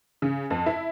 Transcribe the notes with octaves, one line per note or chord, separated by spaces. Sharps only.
C#3
F2
E4